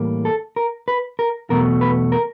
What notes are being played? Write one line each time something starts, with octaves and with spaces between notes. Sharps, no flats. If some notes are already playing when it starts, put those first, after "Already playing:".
Already playing: A2 E3 G3 A#3
A4
A#4
B4
A#4
E2 B2 F#3 A3 A#4
B4
A#4